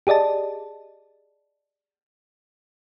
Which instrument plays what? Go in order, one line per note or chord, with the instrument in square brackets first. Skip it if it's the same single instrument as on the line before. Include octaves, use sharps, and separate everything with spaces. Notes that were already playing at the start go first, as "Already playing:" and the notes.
[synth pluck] G4 G#4 D5 D#5 A5